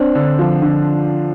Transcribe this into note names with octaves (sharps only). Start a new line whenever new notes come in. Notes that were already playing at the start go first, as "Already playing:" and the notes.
Already playing: C4 D4
D3
F3
D3